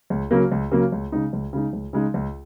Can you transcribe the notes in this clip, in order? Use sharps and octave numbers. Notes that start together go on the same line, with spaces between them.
C#2
C#3 F#3 A#3
C#2
C#3 F#3 A#3
C#2
C#3 G#3 D#4
C#2
C#3 G#3 D#4
C#2
C#3 G#3 D#4
C#2